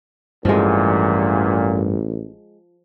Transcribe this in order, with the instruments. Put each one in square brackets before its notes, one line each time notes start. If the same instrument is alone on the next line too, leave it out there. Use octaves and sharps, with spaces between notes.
[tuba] A1 [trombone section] E2 A#2 [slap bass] G2 E3 [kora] F3 G#3